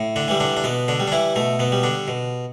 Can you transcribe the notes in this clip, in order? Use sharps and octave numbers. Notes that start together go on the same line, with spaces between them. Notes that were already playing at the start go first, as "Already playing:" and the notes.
Already playing: A2
D3 D4
E3 G3
D3 D4
D4
B2 B3
D3 D4
G3
D4
E3 E4
B2 A3
B2 B3
G3
D3 D4
B2